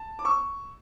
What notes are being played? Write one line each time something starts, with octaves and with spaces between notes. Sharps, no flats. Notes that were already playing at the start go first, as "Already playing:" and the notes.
Already playing: A5
D6
C#6 E6